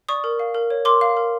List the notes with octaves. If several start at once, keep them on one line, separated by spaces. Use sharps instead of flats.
D5 C#6 D#6
A#4
F5
A#4
C#5
A#4 C6 D6
F5
A#4